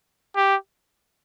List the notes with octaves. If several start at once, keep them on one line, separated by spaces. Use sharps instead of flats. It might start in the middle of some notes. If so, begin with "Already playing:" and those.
G4